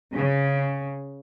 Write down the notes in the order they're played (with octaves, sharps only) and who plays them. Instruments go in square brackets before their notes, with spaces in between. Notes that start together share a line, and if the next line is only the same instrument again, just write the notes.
[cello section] C#3